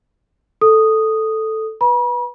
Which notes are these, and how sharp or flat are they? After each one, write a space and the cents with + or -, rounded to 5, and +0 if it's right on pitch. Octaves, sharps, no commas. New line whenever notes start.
A4 +0 D#6 -5
B4 -5 B5 -45